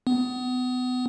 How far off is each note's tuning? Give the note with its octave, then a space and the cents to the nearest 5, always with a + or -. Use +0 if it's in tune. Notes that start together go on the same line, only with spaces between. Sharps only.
B3 +30